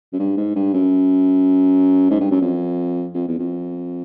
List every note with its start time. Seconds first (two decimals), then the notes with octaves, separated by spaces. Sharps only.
0.13 F#2
0.19 G2
0.37 G#2
0.55 G2
0.73 F#2
2.10 G#2
2.20 G2
2.31 F#2
2.41 F2
3.14 F2
3.28 E2
3.39 F2